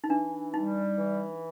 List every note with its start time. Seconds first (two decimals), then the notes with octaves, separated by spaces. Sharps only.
0.04 D#4
0.10 E3 D4
0.54 G3 D#4
0.99 E3